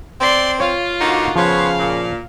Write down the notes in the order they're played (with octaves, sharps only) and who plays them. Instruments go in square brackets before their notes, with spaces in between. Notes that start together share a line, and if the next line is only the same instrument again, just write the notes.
[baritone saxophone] C4 [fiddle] D5 C6
[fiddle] F4 F5 [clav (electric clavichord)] C#5
[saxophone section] D3 A#3 F#4 [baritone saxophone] D#4
[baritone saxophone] C#3 [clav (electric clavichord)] F3 [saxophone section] B3 C5 C#5 [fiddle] F5
[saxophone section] A#2